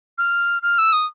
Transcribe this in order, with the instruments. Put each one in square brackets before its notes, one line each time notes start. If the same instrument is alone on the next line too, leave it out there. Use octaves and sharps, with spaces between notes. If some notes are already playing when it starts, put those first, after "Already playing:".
[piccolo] F6
F6
E6
D#6